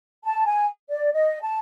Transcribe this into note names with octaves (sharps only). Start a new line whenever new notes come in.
A5
G#5
D5
D#5
A5